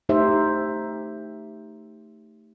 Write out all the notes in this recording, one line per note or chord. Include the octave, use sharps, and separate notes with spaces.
A3 D#4 G4 C5 E5